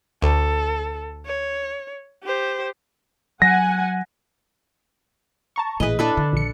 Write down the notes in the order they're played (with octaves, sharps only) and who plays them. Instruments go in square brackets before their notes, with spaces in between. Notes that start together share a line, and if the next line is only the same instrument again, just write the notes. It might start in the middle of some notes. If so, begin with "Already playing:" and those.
[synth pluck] D2 [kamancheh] A4
[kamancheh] C#5
G4 C5
[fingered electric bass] F#3 [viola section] F#5 G#5 [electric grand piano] A#6
[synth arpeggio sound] A5 A#5 C#6
[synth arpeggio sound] A1 E3 G#4 [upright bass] A#2 [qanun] B4 D#5
[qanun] D4 A4 B4 [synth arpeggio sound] E4
[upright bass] D3
[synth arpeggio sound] A#1 C#7